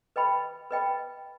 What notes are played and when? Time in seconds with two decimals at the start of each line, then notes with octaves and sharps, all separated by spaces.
0.16 B4 D#5 G5 B5
0.71 B4 D#5 G5 B5